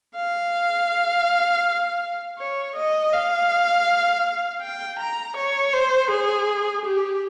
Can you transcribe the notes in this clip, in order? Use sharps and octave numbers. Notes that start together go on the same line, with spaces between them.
F5
C#5
D#5
F5
G5
A#5
C#5
C5
G#4
G4